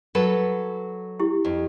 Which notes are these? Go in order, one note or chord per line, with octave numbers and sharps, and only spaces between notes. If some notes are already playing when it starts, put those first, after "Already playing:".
F#3 A4 B4
E4 G4 G5
F2